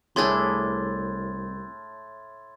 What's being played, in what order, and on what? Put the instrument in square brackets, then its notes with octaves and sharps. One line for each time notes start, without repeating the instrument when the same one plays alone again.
[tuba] C2 [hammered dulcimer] A2 [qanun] D4 E4 G#4 [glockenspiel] C6 G#6 A6